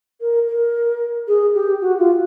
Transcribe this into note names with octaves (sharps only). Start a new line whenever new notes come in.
A#4
A#4
G#4
G4
F#4
F4